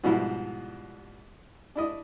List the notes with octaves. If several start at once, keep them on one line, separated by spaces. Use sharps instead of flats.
G#2 B2 F3 G3 E4 F#4
D4 E4 D#5